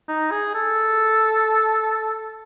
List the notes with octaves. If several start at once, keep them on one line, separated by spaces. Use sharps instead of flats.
D#4
G#4
A4